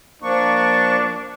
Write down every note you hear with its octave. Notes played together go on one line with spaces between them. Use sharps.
F3 A#3 D4 C#6